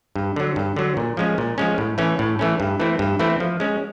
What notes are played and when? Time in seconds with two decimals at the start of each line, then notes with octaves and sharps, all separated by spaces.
0.16 G2
0.36 D3 F#3
0.56 G2
0.76 D3 F#3
0.97 A#2
1.17 F3 G#3 C#4
1.38 A#2
1.58 F3 G#3 C#4
1.78 A2
1.98 E3 A3 C#4
2.19 A2
2.39 E3 A3 C#4
2.60 G2
2.80 E3 A3 C4 E4
2.99 G2
3.19 E3 A3 C4 E4
3.40 F3
3.60 G#3 C#4